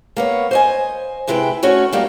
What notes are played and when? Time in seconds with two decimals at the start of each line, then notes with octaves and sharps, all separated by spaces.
0.17 A#3 B3 C#5
0.51 C5 D#5 G#5
1.27 C3 G#3 E4 B4 G5
1.63 A3 C#4 F#4 C#5
1.93 G3 A3 A#3 A#4 D#5